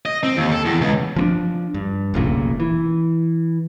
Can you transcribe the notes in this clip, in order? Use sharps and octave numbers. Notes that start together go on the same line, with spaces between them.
D#5
C4
D#2
A4
E2
C#2
F3 C4 D4
G2
F1 B1 A#2 C#3
E3